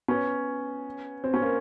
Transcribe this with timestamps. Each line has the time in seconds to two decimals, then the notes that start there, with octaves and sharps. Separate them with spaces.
0.08 B3 C#4
1.24 C4
1.34 C#4
1.41 A#3 C4